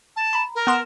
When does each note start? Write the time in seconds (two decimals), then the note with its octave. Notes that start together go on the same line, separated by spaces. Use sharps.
0.16 A5
0.33 A#5 B5
0.55 A#4
0.67 B3 C6 E7